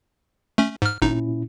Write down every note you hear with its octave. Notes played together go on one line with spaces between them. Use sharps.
A3 C#4
G#2 F6
G#1 A#2 C#4 D#4 E4